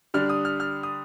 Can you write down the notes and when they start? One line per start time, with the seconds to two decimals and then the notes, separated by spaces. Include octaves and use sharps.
0.14 D3 G3 D4 F6
0.29 D#6
0.45 F6
0.60 F6
0.83 D#6